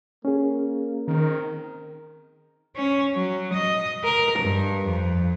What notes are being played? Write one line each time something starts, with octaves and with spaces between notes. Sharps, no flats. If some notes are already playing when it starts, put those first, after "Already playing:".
A#3 C#4 G#4
D#3 C4 A#4
C#4
F#3
D#5
A#4
G2
F2